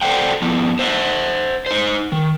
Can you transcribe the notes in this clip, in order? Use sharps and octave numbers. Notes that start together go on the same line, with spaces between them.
A4 C5 D5 F#5 G5
F3 B3 E4
C5 E5 F#5
D#4 C5
D#3